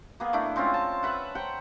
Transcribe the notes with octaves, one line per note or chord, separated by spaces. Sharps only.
A#3 B3 G#4
A3 D4 E4
G#3 C4 C#4 F4
A5
B4 E5 F#5
C5 F#5 G5 A#5